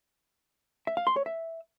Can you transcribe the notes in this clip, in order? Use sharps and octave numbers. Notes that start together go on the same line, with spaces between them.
E5
F5
C6
C#5
E5